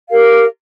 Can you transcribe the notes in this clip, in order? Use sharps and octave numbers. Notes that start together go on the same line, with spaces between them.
G4 A#4 F5